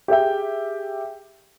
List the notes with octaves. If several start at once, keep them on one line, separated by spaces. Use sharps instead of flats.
G4 G#4 E5 G5